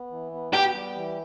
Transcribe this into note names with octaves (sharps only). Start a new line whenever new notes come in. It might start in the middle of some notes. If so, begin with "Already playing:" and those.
Already playing: B3
E3
B3
B3 G4
G3
E3